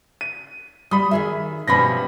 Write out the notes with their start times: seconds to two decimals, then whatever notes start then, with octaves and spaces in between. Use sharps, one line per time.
0.21 D#7
0.91 G3 B5 D#6
1.11 D#3 G#4 E5
1.68 G2 B2 F3 C#4 B5 A#6